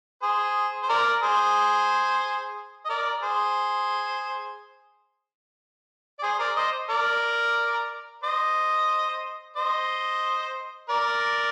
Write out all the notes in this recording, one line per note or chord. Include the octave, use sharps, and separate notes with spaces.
G#4 C5
C5
A#4 D5
G#4 C5
D#5
A#4 D5
G#4 C5
D5
G#4 C5
A#4 D5
C5 D#5
A#4 D5
C5 D#5
C5 D#5
A#4 D5